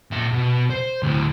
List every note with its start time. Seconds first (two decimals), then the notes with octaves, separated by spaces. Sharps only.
0.11 A#2 E5
0.32 B2
0.70 C5
1.03 D2 A2